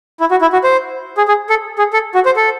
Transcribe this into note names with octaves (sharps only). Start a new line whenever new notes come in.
E4
F#4
E4
F#4
C5
G#4
G#4
A4
G#4
A4
F#4
C5
A4